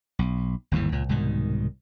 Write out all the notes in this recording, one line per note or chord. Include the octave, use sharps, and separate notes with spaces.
B1
G1 D#2 G#2 E3
C#2 A#2
C2 G#2 B2 D#3